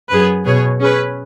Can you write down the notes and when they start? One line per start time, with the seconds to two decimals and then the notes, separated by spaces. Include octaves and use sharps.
0.10 F#2 B3 G#4 B4
0.45 B2 B3 G#4 C#5
0.80 C#4 G#4 B4